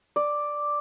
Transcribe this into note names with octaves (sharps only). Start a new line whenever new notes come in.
D5